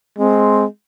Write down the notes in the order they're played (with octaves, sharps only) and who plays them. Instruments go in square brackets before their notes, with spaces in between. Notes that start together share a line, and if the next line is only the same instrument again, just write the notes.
[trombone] G#3 [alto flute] C4